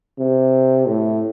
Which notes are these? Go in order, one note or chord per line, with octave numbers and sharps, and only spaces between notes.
C3
A2